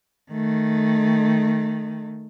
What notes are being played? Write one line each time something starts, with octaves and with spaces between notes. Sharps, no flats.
D#3 A3